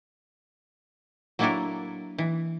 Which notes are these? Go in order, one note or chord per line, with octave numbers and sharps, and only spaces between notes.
F#3 A#3 D4 E4 A4 A#4
E3